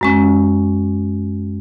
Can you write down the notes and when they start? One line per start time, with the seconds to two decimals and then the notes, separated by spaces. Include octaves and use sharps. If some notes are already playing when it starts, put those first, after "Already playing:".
0.01 F#2 G#3 C#4